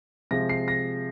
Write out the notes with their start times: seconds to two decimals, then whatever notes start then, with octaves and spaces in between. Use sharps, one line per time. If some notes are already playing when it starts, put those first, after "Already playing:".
0.31 C3 F3 G#3 A#6
0.49 C7
0.68 A#6